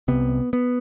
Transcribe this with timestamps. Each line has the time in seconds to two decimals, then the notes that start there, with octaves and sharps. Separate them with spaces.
0.08 C2 C3 B3
0.53 B3